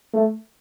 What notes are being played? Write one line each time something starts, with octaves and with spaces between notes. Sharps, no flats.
A3